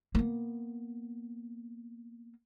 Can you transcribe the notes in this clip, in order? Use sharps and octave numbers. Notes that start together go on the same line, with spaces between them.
A#3 B3